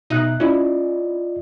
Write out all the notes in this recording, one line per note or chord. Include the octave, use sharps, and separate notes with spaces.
B2 D#4 E5 F#6
C#4 E4 F4 D5 D#5